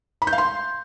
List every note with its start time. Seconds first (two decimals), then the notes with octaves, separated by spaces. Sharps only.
0.22 B5
0.27 G6
0.33 F5
0.38 C6